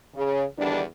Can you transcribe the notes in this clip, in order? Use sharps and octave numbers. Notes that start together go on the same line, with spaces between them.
C#3
E2 D3 D#3 G3 D4